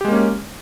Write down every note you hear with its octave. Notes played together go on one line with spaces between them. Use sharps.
G#3 A#3 C#4 G4